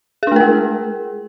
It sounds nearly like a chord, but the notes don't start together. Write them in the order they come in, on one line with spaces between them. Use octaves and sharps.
G#4 D4 A3 A#4 G#3